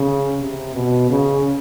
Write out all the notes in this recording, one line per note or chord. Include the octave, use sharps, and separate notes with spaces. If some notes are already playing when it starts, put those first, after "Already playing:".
Already playing: C#3
C3
B2
C#3